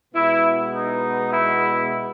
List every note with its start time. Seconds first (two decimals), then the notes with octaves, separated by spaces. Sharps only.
0.14 B2 G#3 B3 E4
0.73 D#4
1.32 E4